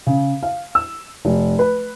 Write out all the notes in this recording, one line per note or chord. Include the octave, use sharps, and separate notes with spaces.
C#3
F5
E6
F1
B4